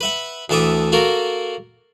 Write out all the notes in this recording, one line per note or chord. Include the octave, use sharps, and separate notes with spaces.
B4 E5 F#5
D2 E3 A4 E5 D6 D#6
A#3 F#4 A4 A#4